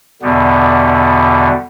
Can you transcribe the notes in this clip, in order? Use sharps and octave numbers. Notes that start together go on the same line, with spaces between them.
E2 B2 D3 G3 B3